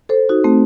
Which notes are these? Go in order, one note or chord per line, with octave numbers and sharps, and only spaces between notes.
A4 C5
D#4 F#4
A3 C4